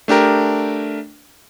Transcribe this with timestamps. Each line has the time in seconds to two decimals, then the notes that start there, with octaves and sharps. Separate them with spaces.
0.08 A3 D4 G4 A#4